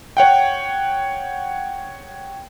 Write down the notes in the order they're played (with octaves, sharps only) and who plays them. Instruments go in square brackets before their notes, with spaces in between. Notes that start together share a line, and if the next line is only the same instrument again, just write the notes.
[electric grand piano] C#5 F#5 G5